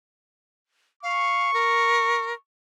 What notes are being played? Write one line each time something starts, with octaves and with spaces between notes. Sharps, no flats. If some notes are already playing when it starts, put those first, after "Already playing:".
F5 C#6
A#4